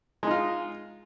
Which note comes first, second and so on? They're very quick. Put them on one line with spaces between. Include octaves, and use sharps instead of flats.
G#3 D#4 F4